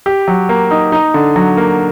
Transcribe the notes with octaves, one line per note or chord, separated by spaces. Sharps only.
G4
F#3
A#3
D#4
D#4
D3
F#3
A#3